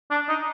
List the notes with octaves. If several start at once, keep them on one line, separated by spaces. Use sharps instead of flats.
D4
D#4